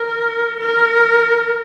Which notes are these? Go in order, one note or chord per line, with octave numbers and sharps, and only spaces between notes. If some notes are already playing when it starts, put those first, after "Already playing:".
Already playing: A#4
A#4